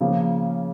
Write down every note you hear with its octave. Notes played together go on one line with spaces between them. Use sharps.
C#3 F3 A#3